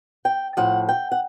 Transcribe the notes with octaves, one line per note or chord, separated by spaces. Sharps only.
G5
A2 F3 F#5
G5
F#5